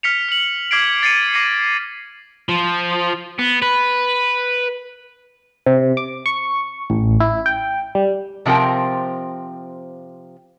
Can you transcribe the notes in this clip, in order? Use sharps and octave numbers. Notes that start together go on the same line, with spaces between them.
F6 B6 C#7 F7
F6 F#7
D6 F6 G#6 B6 C7 D7
A6 C7 C#7 D#7
D6 A#6 C7 C#7 D#7
F3
B3
B4
C3
D6
C#6
A1
E4
G5
G3
C3 F3 C4 A#4 G5